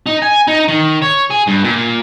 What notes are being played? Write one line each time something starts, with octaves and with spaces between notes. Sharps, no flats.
D#4
G#5
D#4
D#3
C#5
G#4
G2
A#2